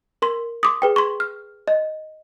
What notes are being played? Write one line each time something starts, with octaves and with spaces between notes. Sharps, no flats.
A#4 C6
C6 D6 D#6
G#4 B4 G5
C6 C#6
F6
D#5